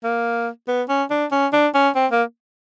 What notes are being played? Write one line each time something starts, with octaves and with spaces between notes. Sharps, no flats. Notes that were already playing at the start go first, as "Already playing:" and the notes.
A#3
B3
C#4
D4
C#4
D4
C#4
C4
A#3